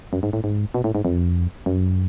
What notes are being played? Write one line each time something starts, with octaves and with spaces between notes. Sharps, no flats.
F#2
G#2
A2
G#2
B2
A2
G#2
F2
F#2